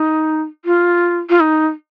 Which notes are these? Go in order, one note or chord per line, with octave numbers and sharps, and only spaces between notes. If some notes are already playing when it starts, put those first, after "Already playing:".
Already playing: D#4
F4
F4
D#4